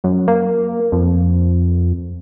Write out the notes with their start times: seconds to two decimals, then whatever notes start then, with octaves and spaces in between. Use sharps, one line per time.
0.04 F#2
0.28 A#3
0.92 F2